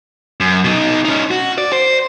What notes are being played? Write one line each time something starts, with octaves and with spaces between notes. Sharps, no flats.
F#2
B2 D#4
C#4 D#4
F#4
D5
C5